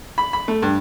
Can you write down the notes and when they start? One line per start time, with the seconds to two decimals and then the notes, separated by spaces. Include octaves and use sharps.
0.18 B5
0.33 B5
0.48 A3
0.62 G2